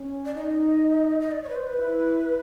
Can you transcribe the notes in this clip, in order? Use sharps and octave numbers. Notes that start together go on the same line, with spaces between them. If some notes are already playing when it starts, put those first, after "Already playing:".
Already playing: C#4
D5
D#4 D#5
D#5
D5
C#5
B4
C5
B4
E4